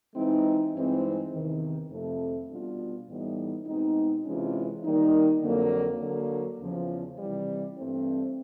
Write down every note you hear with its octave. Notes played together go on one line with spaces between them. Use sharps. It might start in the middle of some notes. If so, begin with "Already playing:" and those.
E3 G#3 C4 D#4
G2 E3 G#3 C4 D#4
E2 C3 D#3
F2 C3 F3 A3
B2 G3 B3 D4 F4
A2 E3 G3 B3 D#4
B2 G#3 C4 D#4
C3 E3 G#3 C#4 F4
D#3 G3 A#3 D#4
F2 D3 F#3 A#3
D3 F#3 A#3
E2 C#3 F3
C3 E3 G3
G2 E3 A3 C4